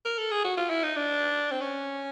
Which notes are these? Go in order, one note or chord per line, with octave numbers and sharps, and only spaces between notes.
A#4
A4
G#4
F#4
F4
E4
D#4
D4
C4
C#4